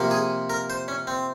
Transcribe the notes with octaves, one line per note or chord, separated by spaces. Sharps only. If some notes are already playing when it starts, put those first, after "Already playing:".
Already playing: C3 F3 A#3
G#4
A#4
C5
C#4
C4